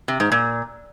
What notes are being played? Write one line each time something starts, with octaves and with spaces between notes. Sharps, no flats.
C3
G#2
A#2